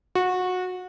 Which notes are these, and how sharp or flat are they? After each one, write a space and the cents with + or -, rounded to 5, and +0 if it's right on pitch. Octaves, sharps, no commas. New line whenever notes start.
F#4 -20